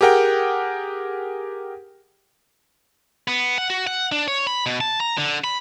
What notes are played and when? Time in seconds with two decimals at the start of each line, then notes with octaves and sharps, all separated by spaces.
0.01 G4 G#4 A#4 F#5 G5
3.28 B3
3.58 F#5
3.70 F#4
3.87 F#5
4.12 D4
4.28 C#5
4.47 B5
4.66 B2
4.81 A5
5.00 A#5
5.18 D3
5.44 B5